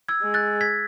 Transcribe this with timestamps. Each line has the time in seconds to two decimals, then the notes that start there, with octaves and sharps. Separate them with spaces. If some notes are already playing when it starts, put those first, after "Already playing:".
0.09 E6 G#6
0.22 G#3
0.34 F#6 A6
0.61 G#6 B6